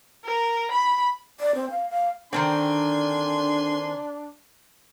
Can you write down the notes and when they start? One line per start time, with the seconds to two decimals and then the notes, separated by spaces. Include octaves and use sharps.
0.24 A#4
0.71 B5
1.40 D5
1.55 C4
1.70 F5
1.90 F5
2.33 D3 D#3 A#3 C4 D4 G#5 C6